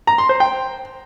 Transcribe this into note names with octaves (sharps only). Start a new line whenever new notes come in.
A#5
C6
C5
G5